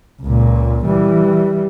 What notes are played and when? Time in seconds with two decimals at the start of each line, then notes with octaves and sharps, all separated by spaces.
0.22 C#2 A#2
0.85 E3 G3